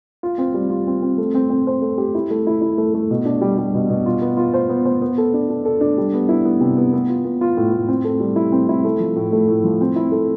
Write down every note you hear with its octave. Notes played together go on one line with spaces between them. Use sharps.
F4
C4
G3
F4
C4
C4
A3
C4
C4
C5
A3
G4
E4
A3
E4
E4
A3
A3
B2
D4
G3
G3
B2
B2
F4
B3
F4
C5
B3
C5
B3
A4
D4
D4
A4
D4
G3
B3
E4
B3
C3
B3
B3
F4
B3
F4
A2
A2
C4
A4
G3
E4
C4
E4
A3
F3
A2
A3
A2
F3
C4
E4
A3